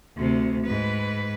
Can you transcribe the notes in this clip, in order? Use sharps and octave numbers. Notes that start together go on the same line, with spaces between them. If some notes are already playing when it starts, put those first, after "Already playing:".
D2 C3
G#2 B4